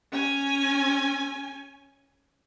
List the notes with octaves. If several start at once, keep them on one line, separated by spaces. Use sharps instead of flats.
C#4 G#5